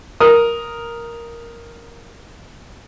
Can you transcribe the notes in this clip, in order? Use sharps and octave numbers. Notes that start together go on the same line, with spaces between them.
A#4 D#6